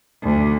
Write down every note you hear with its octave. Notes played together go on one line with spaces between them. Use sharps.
D2